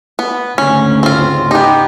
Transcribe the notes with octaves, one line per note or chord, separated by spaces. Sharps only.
B3
D2 G#2 C#3 C#4
C4 F4
B3 D#4 G4